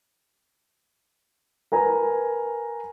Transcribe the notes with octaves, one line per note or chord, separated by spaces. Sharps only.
A#4 B4 G#5 A#5